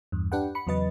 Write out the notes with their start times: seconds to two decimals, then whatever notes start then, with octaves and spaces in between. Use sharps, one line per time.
0.12 E2 G2
0.32 D4 G4 B4 F#5 G5
0.55 B5 C#7
0.67 E2 C#3 F#3 B4 D#5 A6